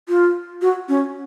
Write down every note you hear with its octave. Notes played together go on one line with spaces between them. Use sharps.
F4
F#4
C#4